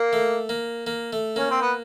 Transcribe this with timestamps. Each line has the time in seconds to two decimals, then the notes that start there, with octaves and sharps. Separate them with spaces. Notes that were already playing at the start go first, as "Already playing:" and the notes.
Already playing: A#3
0.13 A3
0.49 A#3
0.87 A#3
1.13 A3
1.36 A#3 C#4
1.51 C4
1.61 B3